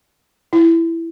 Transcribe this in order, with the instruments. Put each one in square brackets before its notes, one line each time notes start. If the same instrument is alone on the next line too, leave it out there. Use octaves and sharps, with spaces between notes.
[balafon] E4